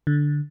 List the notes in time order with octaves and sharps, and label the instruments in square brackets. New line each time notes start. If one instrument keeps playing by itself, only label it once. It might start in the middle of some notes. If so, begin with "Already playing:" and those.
[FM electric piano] D3